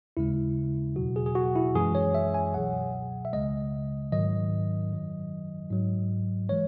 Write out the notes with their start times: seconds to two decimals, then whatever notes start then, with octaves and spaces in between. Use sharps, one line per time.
0.17 D#2 C#3 G#3 E4
0.96 E2 B2 F#3 F#4
1.16 G#4
1.26 G#4
1.35 F#4
1.55 E4
1.75 F#2 E3 G#3 G#4
1.95 C#5
2.15 E5
2.34 G#5
2.54 C#2 B2 F#3 F#5
3.25 E5
3.33 C#2 C#3 G#3 D#5
4.12 G#2 D#3 F#3 D#5
4.91 F#2 D#3 F#3
5.70 G#2 F#3
6.49 E3 G#3 C#5